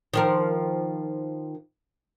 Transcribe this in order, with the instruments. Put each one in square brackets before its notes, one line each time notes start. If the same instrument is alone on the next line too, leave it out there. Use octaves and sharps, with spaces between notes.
[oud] D#3 F3 A#4